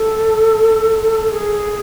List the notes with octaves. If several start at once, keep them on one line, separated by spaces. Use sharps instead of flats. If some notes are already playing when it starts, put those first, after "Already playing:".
Already playing: A4
G#4